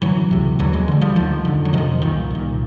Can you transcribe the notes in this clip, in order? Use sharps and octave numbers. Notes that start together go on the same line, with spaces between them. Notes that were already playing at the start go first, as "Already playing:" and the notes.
F#2 D3 E3 F#3
C#2 C3
D#2 D3 E3 F#3
F#3 G#3
D2 D3
F3 G3
D2 D3 D#3 F3
F2 D3
F#3
F2 C3 D#3 F3
C2 A#2 D#3
C2 A#2